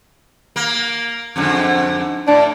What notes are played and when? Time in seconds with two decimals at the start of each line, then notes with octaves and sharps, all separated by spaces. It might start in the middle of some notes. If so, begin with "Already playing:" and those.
0.56 A#3
1.36 F2 G#2 D3
2.28 A2 D4